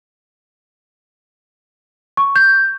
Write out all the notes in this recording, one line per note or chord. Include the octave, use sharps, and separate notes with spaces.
C#6
G6